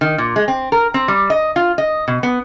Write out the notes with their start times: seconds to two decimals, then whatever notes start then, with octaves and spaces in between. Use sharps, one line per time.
0.01 D#3
0.18 A#2
0.36 G#3
0.48 C4
0.72 A#4
0.94 C4
1.08 G3
1.30 D#5
1.56 F4
1.78 D#5
2.08 B2
2.23 B3